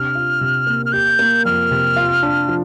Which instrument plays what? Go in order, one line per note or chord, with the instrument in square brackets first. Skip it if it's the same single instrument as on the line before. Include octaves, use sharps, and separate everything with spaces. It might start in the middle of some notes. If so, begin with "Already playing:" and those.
Already playing: [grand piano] C3 D4 [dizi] F6
[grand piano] F4
C3
A#3
[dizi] F6
[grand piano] G4 [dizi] G6
[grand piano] A#3
[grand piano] F2 [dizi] F6
[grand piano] C3
F4
D4
F3